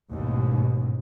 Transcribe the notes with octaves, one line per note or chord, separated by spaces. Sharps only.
A1 D#2 G#2 B2